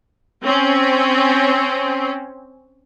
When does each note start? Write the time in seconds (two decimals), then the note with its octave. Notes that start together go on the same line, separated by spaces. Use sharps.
0.44 C4 C#4